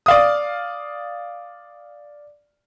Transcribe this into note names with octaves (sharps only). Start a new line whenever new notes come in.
D5 F5 D#6